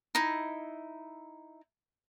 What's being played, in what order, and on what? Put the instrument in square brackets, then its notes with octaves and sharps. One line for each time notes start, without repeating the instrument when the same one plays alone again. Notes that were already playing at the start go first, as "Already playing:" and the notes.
[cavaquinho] D#4 E4